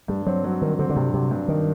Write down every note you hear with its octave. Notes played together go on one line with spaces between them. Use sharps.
G2 G3
F#3 C4
F#3
G2 D#3
D3 C4
D3
G2 C3
C3 F#3
G2
D#3